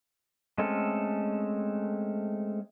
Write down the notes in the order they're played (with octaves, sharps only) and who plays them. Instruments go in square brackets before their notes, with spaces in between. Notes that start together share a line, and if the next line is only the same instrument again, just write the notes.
[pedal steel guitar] G#3 A3 C4 C#4 A4